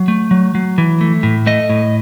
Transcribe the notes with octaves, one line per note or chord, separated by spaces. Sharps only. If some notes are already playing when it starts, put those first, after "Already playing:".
Already playing: F#3
A3
F#3
F#3
E3
A3
A2
A3 D#5
A2